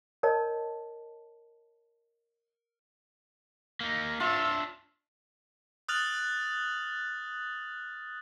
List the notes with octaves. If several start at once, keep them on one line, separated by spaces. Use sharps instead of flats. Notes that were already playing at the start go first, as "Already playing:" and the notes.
A#4 C#5 D#5 A5
A#3 D#4
D4 F4 C#5 E5 E6
D#6 F6 F#6 A6 F7 F#7